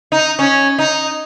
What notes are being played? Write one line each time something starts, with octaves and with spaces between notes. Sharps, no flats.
D#4
C#4
D#4